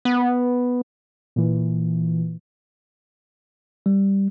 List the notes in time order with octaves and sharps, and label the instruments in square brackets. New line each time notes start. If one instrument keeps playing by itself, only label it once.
[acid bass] B3
[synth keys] A#2 E3
[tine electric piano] G3